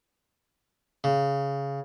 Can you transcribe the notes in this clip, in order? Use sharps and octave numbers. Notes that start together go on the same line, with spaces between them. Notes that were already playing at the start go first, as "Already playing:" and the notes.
C#3